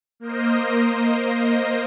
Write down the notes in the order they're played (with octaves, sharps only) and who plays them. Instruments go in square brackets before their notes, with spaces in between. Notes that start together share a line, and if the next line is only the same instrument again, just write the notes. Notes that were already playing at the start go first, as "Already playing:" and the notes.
[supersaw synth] A#3 A#4 C5 D#5